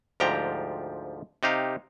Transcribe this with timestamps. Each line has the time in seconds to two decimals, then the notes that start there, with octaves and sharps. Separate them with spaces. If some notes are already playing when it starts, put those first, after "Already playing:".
0.20 D2 G#2 F3 G4 G5 A#5
1.43 C3 D#4 G4 F5